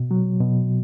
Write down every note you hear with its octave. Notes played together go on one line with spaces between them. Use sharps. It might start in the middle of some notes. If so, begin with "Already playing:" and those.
Already playing: B2
F#3
B2